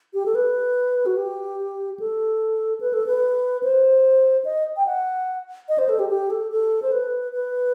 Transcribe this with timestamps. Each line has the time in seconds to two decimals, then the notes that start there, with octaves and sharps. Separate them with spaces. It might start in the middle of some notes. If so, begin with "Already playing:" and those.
0.14 G4
0.26 A4
0.35 B4
1.06 F#4
1.16 G4
2.00 A4
2.80 B4
2.93 A4
3.07 B4
3.63 C5
4.45 D#5
4.77 G5
4.86 F#5
5.69 D#5
5.78 C5
5.89 A4
5.99 G4
6.09 G4
6.30 A4
6.51 A4
6.82 C5
6.92 B4
7.33 B4